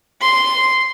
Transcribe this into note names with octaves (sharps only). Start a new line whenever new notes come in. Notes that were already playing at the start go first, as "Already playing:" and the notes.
C6